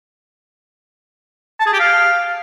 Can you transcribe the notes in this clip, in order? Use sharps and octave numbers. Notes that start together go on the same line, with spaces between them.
A5
G#4
G4
F5